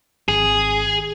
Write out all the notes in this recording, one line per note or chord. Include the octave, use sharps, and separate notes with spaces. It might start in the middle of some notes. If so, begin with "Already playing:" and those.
G#1 G#4